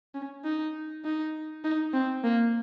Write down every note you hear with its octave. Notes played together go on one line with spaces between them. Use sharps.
C#4
D#4
D#4
D#4
C4
A#3